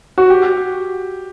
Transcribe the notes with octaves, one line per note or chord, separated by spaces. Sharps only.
F#4
G4